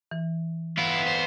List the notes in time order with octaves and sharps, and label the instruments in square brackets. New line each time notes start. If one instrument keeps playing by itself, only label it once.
[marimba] E3
[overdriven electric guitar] B3 F4 [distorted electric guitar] E4
[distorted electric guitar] C5